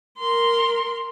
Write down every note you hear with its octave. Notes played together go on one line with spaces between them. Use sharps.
A#4 C6